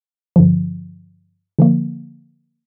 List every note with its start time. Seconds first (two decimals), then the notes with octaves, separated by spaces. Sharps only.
0.36 G2 D3 F3
1.59 D3 F3 A#3